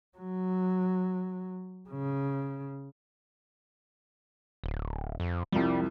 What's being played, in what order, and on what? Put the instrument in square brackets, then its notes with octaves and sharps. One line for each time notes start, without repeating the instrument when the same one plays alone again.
[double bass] F#3
C#3
[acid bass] D1
F2
[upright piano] C2 F2 [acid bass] G3